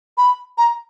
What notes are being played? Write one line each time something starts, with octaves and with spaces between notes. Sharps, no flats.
B5
A#5